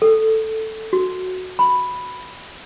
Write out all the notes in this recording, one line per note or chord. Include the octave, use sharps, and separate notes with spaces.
A4
F#4
B5